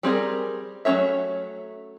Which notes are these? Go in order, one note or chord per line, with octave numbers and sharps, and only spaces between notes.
G3 C4 G#4 A#4
F#3 A3 C#4 C#5 E5